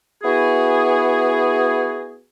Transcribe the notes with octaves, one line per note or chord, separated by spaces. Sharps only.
B3 E4 F#4 G#4